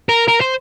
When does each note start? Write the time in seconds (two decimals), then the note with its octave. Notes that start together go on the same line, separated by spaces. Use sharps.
0.09 A#4
0.28 A#4
0.41 C5